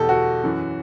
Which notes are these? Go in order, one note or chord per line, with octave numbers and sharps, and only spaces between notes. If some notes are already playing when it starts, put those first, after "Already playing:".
Already playing: E2 B2 G4 A4
F#4
F#2 E3